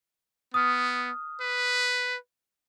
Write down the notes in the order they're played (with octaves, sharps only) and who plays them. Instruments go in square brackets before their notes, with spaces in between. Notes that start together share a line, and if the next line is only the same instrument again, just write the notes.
[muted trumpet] B3 [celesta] D#6 F6
[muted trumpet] B4